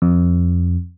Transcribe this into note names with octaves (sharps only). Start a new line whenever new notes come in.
F2